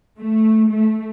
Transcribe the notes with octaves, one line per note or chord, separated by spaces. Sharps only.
A3
A3